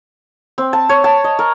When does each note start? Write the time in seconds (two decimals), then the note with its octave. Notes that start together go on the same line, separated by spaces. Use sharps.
0.58 C4
0.73 A5
0.89 C#5
1.04 A5
1.24 D#5
1.39 A#4